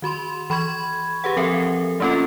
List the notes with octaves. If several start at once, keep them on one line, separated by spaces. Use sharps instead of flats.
D#3 F#4 B5 C6
E3 B5 C#6 G#6
G4 G#4 B4 F#5
F3 C4 G4 A4 A#4 E5
A3 A#3 C#4 F4 A4